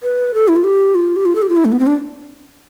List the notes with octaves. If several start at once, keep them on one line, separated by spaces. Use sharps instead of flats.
B4
A4
E4
F4
G4
F4
G4
F4
A4
G4
F4
E4
A3
B3
C4
D4